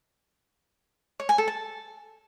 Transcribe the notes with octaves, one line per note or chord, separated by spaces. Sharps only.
C#5
G#5
A4
A5